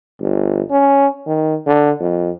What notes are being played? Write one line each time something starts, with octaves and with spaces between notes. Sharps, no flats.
G1
C#4
D#3
D3
F2